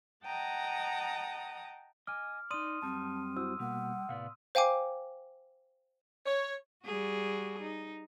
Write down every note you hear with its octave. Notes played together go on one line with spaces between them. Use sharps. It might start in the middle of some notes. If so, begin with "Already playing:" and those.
D#5 F#5 G5 A5 A#5 D#6
D#5 G#5 D6 F6
D#4 D5 C6 D#6 D#7
F#2 G3 C4 A5
E4 F#4 C5 E6
B2 G3 A#3 F#5
A2 C3 B3 D5 F5
C5 F5 G5 G#5 D6
C#5
G3 F#4 G#4
D#4